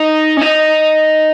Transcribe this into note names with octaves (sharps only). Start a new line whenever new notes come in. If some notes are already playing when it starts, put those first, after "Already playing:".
Already playing: D#4
C#4
D#4